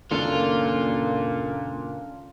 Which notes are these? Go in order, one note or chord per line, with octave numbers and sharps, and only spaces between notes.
C#2 F#2 A#2 D#3 C#4 D4 F4 A4